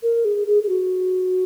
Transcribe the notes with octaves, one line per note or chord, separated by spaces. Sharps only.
A#4
G#4
G#4
G#4
F#4